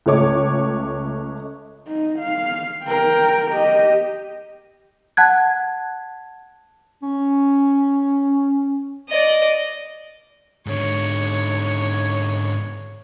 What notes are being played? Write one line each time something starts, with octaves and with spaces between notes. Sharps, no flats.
C#2 A3 C#5 D6
D#4
F5
A#4 G5
G4 D#5
F#5 A5 F#6 G#6
C#4
D5 D#5
G#2 D3 C#5